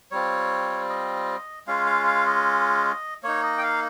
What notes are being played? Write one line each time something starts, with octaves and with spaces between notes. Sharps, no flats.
G3 C4 F4 C#5
D#5
G#3 C#4 F4 F5
F5
F5
D#5
A#3 D#4 C#5
D#5
G5
F5